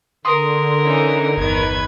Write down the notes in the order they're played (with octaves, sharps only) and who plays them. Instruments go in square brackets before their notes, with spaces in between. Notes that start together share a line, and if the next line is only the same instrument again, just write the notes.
[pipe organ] D3 [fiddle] A#4 [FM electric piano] C6 D#6
[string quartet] E3 C#4 D#4
[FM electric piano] G1 [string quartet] E2 D#3 [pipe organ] B4 G#6